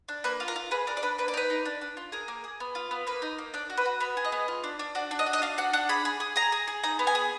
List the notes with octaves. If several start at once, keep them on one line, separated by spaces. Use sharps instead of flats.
D4
A#3 B4
F4
A#4
F4
G#4 B4
D4 A#4
D5
D4 B4
A#3 B4
D5
D#4 B4
D#4
D4
D4
F4
G#4 A#4
A#3
G#4
B3
F4
B3
A#3 B4
D#4
A#3
D4 D5
F#4
B4
F#4
B3 B4
G#4
D#5
B3
F4
D4
D4
F#4 D5
D4
D#5
F#4
D#5
D4 F5
F#4 F#5
D4 F#5
G#4 B5
G#4
G#4
G#4 A#5
G#4
G#4
D#4 A#5
B3
G#5
G#4